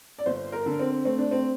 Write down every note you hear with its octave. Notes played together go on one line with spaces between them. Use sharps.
D5
G1 C5
A#4
D3
C4
A3 C4
D4
C4